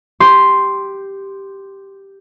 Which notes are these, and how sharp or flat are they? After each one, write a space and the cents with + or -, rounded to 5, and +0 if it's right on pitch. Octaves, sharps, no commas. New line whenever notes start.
G4 +0 C6 +0